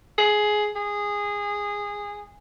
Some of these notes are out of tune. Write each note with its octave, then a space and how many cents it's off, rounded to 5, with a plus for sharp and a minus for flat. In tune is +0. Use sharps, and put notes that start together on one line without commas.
G#4 +15
G#4 -15